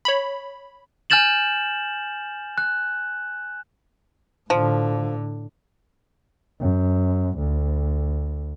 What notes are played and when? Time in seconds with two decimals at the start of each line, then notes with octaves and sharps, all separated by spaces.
0.05 C#5 B5
1.10 G#5 F6 G6 A6 E7 F#7
2.58 F#6
4.50 A2 D3 F3
6.61 F#2
7.39 D2